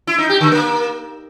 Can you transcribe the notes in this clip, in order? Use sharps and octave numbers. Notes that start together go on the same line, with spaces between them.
E4
D#4
G4
D3
A#3